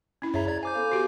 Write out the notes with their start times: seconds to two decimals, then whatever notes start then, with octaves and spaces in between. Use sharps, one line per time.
0.22 C#4 E4
0.34 F#2 E4 G#4 C#5 E5 A#5
0.48 D5 A#5 G#6
0.63 C5 G#5 D6 G6
0.74 B3 A4 F5
0.92 F#4 G4